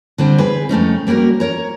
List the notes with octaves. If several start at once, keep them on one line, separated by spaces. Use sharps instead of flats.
D3 G3 C4
G#4 B4
F2 A3 C#4 D#4
G3 A#3 C#4 F#4 A#4
A#4 C#5 A#5